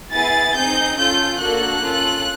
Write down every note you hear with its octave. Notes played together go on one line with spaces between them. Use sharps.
B3 E4 G#4 A6
C4 D#4 G#4 G6
C#4 F4 A4 G6
A#3 D4 F#4 A4 F#6
C#4 F4 A4